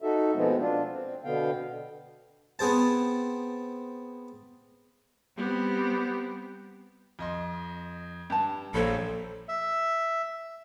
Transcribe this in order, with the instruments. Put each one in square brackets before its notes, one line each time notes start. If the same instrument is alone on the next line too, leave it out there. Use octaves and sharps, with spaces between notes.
[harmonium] D#4 F#4 A4 E5
B2 F3 G#3 A3 B3 C4
D4 F4
C4
B2 D3 B3 F5 G5
[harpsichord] B3 C4 G#4 C5 A5
[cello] G3 C4 [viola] B3 G4
[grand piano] F2 D#5 C6
[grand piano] G2 [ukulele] G4 A5
[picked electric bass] A#1 [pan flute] A4 [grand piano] C5 C#5 B5
[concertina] E5